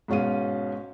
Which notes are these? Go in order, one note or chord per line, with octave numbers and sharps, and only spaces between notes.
G#2 B2 C#4 F5 D#7